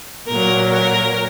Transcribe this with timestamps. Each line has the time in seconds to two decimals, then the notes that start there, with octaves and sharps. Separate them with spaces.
0.28 A#2 F#3 A#4
0.73 A#4